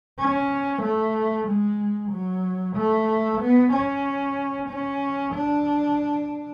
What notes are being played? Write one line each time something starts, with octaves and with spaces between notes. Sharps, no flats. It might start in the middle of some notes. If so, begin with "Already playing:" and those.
C#4
A3
G#3
F#3
A3
B3
C#4
C#4
D4